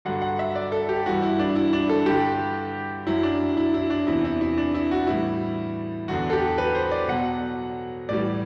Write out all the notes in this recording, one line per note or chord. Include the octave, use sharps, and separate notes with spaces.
G2 D3 F#3 F#5
F#5
E5
D5
A4
G4
G2 E3 G3 F#4
E4
D4
E4
D4
A4
G2 D3 G3 G4
F#2 F#3 E4
D4
E4
E4
D4
E2 C3 E3 E4
E4
E4
D4
E4
F#4
A2 E3 G3 E4
E2 D3 F#3 F#4
A4
G4
B4
C5
D5
B2 F#3 F#5
A2 E3 G3 D5